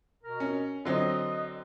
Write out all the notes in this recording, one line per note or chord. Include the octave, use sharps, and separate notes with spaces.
B2 A#4
C#4
D3 F#3 C4 D#5